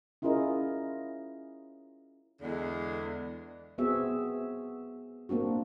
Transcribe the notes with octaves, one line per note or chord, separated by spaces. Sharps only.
C#4 E4 F4 G#4 A#4 D#5
E2 D3 G#3
B3 C4 F#4 G#4 E5
A#3 C4 D4 F#4